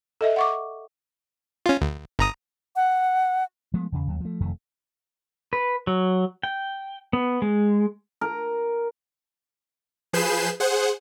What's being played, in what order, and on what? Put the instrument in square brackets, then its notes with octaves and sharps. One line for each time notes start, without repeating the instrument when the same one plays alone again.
[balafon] A4 D#5 E5
F#5 C#6 D6
[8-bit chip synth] C#4 F4
D2
G1 A#5 D#6
[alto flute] F#5
[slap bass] F3 G#3 A3 B3
E2 C#3
D#2 F#3
F3 A3
F1 F2 D#3 A3
[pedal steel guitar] B4
F#3
G5
B3
G#3
[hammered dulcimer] A#4
[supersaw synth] F3 G#4 B4 G6 C7 E7
G#4 C5 F#5